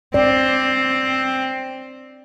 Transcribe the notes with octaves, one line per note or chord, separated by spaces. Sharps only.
C4 D5